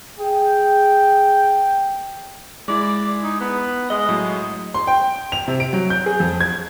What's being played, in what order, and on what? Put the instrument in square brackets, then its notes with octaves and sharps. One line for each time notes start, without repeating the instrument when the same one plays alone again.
[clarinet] G#4 [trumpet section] G5
[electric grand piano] G#3 E4 [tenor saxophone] D5
[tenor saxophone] D#4
B3
[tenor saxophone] G#3 [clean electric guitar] D#5
[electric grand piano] A2 F#3
[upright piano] C6
G5
F7
C3
D7
F#3
G6
G#4
F2
G#6